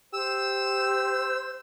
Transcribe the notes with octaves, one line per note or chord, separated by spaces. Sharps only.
G4 C5 E6